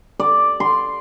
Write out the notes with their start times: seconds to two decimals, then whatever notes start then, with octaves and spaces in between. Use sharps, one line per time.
0.20 D5
0.60 C6